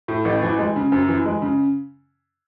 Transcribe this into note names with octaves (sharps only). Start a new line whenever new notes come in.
A2
A1
E3
G#3
C#3
F#2
E3
G#3
C#3